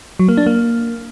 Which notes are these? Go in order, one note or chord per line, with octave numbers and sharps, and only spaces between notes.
F#3
A#3
D4
A#3